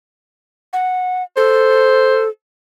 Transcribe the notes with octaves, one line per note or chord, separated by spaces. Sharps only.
F#5
A4 C5